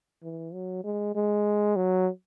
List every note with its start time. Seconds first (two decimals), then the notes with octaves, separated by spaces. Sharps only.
0.22 E3
0.53 F#3
0.84 G#3
1.15 G#3
1.76 F#3